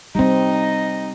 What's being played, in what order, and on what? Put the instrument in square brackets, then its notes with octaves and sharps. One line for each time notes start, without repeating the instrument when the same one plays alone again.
[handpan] G3 C4 [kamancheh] D#4 D#5